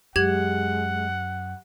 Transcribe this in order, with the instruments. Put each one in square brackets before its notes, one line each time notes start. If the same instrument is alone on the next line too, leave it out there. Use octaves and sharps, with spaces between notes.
[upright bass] F#2 [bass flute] G#3 [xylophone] G4 G#6 F#7 [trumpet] F#5